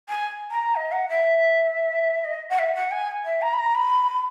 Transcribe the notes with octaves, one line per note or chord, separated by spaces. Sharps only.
G#5
A#5
D#5
F#5
E5
D#5
F#5
E5
F#5
G#5
E5
A#5
B5
A#5
B5